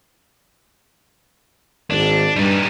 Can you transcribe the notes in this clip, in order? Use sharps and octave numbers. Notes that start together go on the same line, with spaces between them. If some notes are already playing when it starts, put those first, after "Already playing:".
G#1 D4
G2 G3 D#4